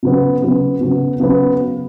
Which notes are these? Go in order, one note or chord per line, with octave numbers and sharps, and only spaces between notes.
C#3 F#3 B3
C#3 F#3 B3
C#3 F#3 B3
C#3 F#3 B3